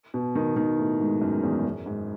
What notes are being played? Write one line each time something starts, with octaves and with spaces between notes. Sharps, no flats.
B2
D#3
D#3
A2
G#2
F#2
E2
F#2
G#2